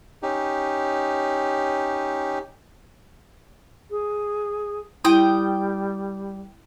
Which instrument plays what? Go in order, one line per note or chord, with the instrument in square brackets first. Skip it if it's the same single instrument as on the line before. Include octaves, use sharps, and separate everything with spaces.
[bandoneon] C#4 D#4 G4
[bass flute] G#4
[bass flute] G3 [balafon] E4 [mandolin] G5 D#6